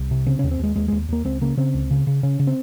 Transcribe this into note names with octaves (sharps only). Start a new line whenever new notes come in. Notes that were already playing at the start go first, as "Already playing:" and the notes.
Already playing: C2
C3
C#3 C4
C#4
D#2
C4
D#2 G#3
D#2 G#3
G#3
D#2
D#2 A#3
C#2 C4
C#3 A#3
C#3 C4
C#2
C#3
C#3
C#3 C#4
C#3
C4